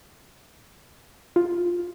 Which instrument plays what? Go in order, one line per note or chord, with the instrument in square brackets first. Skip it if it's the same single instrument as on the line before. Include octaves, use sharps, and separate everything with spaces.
[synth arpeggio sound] F4